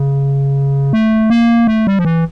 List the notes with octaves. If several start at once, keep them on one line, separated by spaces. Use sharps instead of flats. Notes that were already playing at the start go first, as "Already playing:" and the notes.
Already playing: C#3
A3
A#3
A3
G3
F3
E3